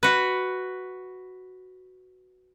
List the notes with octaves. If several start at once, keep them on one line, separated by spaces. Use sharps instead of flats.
F#4 B4